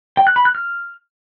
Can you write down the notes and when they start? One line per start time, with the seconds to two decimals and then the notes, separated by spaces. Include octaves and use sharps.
0.17 G5
0.27 F#6
0.36 B5
0.45 F#6
0.55 F6